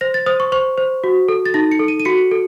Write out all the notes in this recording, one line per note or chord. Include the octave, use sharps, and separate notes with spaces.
C5 A#6
A6
C5 D#6
C#6
C5 C#6
C5
F#4
A4
A6
D#4 A#6
C#7
A4
D#7
D#7
F#4 C#7
A4